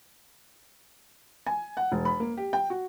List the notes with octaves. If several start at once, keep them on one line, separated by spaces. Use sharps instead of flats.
G#5
F#5
E1
B5
A#3
G4
G5
F#4